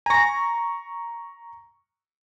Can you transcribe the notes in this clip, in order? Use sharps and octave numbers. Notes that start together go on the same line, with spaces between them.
G#5 A#5 C#6 A#6